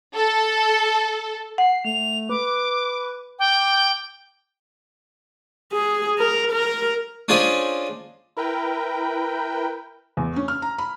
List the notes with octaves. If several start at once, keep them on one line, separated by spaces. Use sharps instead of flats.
A4
F#5 C7
A3 F7
B4 D6
G5 D6
G#4
A#4
A#4
C#4 D4 F4 G#4 C5 D#5
E4 A#4 B4 G5
E2
C#4
F6
A#5
B5